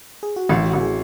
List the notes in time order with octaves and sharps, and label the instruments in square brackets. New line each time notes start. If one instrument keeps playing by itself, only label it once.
[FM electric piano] G#4
F#4
[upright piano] A1 [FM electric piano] E4
[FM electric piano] F#4
[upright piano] A1
[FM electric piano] G#4